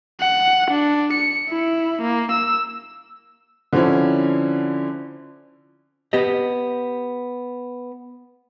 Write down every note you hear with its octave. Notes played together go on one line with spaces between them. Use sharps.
F#5
D4
C#7
E4
A#3
E6
D3 F3 C4 C#4 E4
B3 G4 D#5